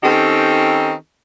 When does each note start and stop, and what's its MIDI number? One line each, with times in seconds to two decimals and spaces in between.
0.03 0.92 51
0.03 0.92 60
0.03 0.92 61
0.03 0.92 63
0.03 0.92 67
0.03 0.92 69